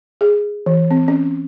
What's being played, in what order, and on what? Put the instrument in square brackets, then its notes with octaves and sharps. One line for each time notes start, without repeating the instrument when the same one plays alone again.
[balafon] G#4
E3
C4
C#4